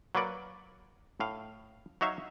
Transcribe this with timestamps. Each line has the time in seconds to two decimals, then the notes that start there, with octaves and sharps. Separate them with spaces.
0.15 F#3 A#3 B4 D5 F#5
1.20 A2 F5
2.01 F#3 D#4 C#5 E5 F5